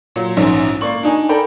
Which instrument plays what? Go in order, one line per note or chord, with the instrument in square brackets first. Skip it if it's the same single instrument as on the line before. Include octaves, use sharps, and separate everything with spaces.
[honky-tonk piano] A#2 F#3
A#1 G#2 E3 C#4
A#3 D5 C#6 F#7
D4 D#4 G#5
A4 A#4 D5 G5 B5